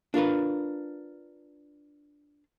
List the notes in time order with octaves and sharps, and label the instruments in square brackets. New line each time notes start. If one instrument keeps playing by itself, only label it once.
[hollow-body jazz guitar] D4 F4 A#4 B4